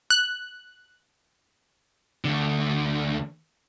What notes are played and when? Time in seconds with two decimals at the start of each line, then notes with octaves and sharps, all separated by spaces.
0.10 F#6
2.25 D2 D3